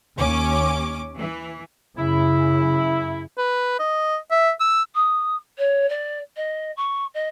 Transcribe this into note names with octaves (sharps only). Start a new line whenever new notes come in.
D#2 C#4 D6
E3
F#2 C#3 E4
B4
D#5
E5
E6
D#6
C#5
D5
D#5
C#6
D#5